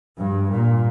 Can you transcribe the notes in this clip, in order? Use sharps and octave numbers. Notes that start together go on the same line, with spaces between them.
G2
A#2